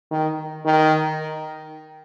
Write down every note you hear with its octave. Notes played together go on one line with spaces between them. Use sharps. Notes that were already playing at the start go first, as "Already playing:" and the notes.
D#3
D#3